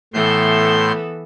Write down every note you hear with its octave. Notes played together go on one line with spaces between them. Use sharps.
A2 E3 B3 A4 C6 G6